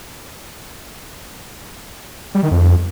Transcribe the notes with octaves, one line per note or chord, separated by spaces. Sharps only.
G3
D#3
F2